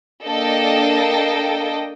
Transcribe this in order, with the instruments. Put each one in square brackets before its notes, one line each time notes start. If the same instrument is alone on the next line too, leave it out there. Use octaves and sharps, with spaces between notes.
[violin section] A#3 D4 A4 D#5 G5